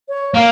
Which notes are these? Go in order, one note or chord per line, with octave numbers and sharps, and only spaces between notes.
C#5
A#3 F5